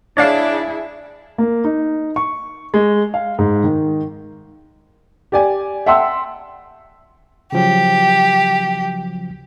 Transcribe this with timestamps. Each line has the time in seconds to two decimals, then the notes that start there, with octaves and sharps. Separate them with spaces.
0.17 D4 E4 G#4 C#5 D5 F5
1.38 A#3
1.64 D#4
2.16 C#6
2.74 G#3
3.14 F5
3.39 G#2
3.64 D#3
5.32 G4 D5 G#5
5.86 E5 F#5 G5 A5 C6 E6
7.52 C#3 F3 F#3 G4